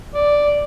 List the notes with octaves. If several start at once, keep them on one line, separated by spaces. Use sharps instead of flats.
D5